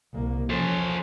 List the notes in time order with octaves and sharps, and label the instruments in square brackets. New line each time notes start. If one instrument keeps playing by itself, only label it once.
[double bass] C2 A#3
[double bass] F3 C#4 [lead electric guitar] A4 C5